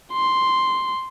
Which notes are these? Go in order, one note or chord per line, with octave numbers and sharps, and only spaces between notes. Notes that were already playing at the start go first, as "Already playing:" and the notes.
C6